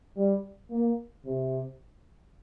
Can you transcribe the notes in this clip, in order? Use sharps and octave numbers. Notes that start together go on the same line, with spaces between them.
G3
A#3
C3